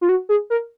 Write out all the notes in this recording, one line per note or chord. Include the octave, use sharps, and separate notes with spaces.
F4
F#4
G#4
A#4